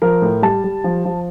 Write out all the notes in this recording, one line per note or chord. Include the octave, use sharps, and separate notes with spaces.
F3 A#4
A2
G3 A5
G3
F3
F3